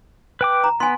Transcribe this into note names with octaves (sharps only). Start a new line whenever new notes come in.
B4 G5 D6
A#5
B3 G#5 C6